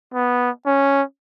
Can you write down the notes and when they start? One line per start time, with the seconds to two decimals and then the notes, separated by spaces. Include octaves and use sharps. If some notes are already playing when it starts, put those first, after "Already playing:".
0.14 B3
0.66 C#4